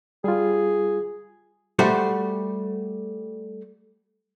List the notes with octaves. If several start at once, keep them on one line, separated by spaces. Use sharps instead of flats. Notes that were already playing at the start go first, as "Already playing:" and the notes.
G3 F4 G#4
G3 A3 F#4 G4 C5